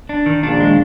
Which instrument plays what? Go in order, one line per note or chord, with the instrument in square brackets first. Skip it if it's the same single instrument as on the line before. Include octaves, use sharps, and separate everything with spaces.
[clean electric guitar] D4
D#3
[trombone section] A#1 A#2 [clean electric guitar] D4
[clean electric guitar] G#3